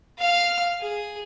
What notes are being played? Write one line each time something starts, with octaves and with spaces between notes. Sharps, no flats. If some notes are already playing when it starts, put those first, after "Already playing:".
F5 F6
G#4